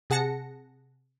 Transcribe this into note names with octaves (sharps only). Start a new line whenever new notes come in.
C3 G#4 F#5 A5 A#6 C#7